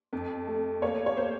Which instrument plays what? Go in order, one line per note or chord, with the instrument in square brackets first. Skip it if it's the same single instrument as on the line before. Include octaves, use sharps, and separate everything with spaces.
[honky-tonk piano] F2
A3
A#3 C#5
C#5
A#3 C5